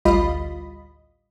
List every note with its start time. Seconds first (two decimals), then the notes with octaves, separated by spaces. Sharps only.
0.05 A1 D2 G3 F4 D#5 B5